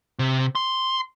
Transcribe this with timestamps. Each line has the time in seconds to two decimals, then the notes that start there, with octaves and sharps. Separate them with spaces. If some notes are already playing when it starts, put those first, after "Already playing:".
0.19 C3
0.55 C6